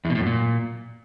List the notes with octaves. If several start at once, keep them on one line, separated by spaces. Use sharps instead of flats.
E2
B2
A2
F#2
A#2